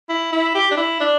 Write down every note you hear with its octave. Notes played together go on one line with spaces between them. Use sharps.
E4
E4
G4
D4
E4
D4